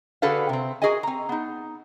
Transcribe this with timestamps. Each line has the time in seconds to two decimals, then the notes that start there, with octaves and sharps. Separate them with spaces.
0.22 D3 F#4 G#4 A4 B4 F5
0.49 C3 C4
0.82 F#4 G#4 A#4 D#5 G#5
1.03 C4 A#5
1.29 B3 D#4